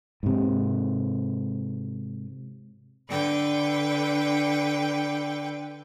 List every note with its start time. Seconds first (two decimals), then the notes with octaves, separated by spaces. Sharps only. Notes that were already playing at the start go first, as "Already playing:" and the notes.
0.23 G#2 C3
3.08 D3 B4 G5